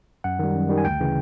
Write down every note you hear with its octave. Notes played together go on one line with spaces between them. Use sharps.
F#2 F#5
D#3 G3
F#2
D#3 G3
G#5
D2 G5
C#3 E3